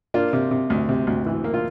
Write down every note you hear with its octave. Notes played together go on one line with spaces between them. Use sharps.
A#3 D4 F4
C3
C3
D2
C3
D2
E3
A#3
F4